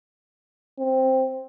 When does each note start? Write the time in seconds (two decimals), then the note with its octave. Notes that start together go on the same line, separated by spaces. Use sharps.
0.79 C4